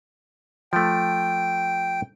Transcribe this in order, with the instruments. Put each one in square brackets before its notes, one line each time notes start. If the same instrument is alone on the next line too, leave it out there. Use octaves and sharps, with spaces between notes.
[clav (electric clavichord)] F3 A3 [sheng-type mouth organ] G5